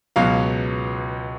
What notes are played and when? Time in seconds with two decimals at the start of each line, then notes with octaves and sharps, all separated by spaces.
0.16 C#2 B2 F#3 F5